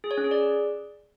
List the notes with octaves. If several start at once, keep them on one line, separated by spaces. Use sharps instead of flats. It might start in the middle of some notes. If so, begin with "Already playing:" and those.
G#4
C#5
C#4
G#4
D5